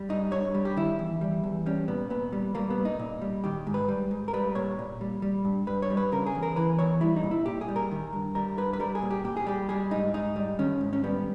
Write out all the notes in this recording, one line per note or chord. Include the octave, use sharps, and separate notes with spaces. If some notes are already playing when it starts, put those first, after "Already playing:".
Already playing: G3
G2 D#4
G2 C#5
G3
G4
D#3 E4
E2
G3
E2
G3 C#4
A#2 B3
A#2 B3
G3
G3 A#3
B3
A#2
D#4
A#2
G3
D#3 G4
G#2
B4
G3
G#2
A#4
G3 B4
A#2 C#5
A#2
G3
G3
G2
G2 B4
C#5
G3
B4
C#3 A#4
G#4
E2
A#4
E3 B4
E2 C#5
G3 E4
D#4
A#2
E4
A#2 G4
G#4
G3
A#4
D#3
G2
G3 A#4
G2 B4
B4
G3 A#4
G#4
A#2
G4
A#2 G4
G#4
G3 G4
G3 G#4
G#2 D#4
G#2 D#4
G3
D#3 C#4
G#2
C#4
G3 B3